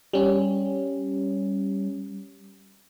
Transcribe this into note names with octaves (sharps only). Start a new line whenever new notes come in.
G3 C#4